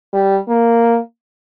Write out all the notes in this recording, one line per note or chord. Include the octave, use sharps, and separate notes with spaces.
G3
A#3